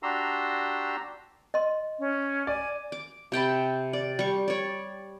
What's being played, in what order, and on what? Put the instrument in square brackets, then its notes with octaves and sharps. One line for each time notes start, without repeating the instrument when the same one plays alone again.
[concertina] D4 F#4 G4 A#5 C6 E6
[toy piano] D#5 C6
[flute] C#4
[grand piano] D5 [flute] G#5
[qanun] D6
C3 G5 A5 B5
D5
G3 C#6
C#5 D5